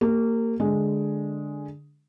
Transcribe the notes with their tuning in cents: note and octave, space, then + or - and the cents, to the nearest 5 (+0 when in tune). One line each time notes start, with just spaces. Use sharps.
A#3 -25 G4 +5
D3 +0 G#3 +0